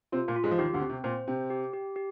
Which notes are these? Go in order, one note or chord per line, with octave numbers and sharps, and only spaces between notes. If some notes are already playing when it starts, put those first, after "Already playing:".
C3 C4 F4
A#2 A#3
F4
G#2 G#3
F3
D#2 D#3 G4
D2 D3
C4
C3
A#2 C5
C3 G5
G4
G4
G4